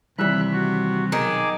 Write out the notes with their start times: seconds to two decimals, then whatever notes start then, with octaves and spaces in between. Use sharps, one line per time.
0.18 D#2 C3 E3 G3 E5 B5 F#6
0.52 F#4
1.12 B1 D#3 G#4 D6